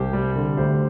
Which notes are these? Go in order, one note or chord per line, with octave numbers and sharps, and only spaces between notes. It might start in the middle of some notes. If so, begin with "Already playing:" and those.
Already playing: C2 G4 C5
G3
D3
D2 G4 C5